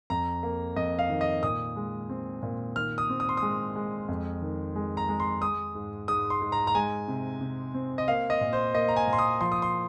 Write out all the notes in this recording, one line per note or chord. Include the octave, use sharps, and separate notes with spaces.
F2 A#5
A#3
F2 D#5
F5
D#3
D#5
A#2 D#6
G#3
C4
A#2
D#3 F6
D#6
C4
D#6
C6
G#3 D#6
G#3
F2
D#3
G#3
A#5
G#3
C6
G#3 D#6
G#2
G#2 D#6
C6
G#2
A#5
A#5
G#3 G#5
C3
C3
C4
D#5
A#3 F5
D#5
A#2
C5
A#3 D#5
A#5
G#5
A#2
C6
D#6
F3 C6
D#6
C6